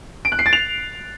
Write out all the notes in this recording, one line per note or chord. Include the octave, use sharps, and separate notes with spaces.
D7
F#6
C7
A6
F7